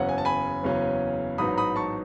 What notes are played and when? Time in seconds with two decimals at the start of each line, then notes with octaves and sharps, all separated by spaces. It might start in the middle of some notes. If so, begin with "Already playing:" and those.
Already playing: F#1 E2 C#3 F#3 C#4 F#5
0.09 G#5
0.18 A5
0.25 G#5 B5
0.63 F#1 E2 C#3 F#3 C#4
1.38 A1 G#2 F#3 B3 D#4 B5 D#6
1.58 B5 D#6
1.76 A5 C#6